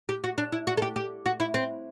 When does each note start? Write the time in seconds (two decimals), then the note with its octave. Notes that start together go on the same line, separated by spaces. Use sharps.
0.09 G4
0.24 F#4
0.38 D4
0.52 E4
0.67 F#4
0.77 A4
0.82 G4
0.96 G4
1.26 F#4
1.40 E4
1.54 C4